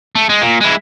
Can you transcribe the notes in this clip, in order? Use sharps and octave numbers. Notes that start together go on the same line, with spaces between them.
A3
G#3
A#2
G#3 E4